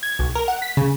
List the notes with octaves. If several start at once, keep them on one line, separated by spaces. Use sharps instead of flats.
G#6
B1
A#4
F#5
B6
C#3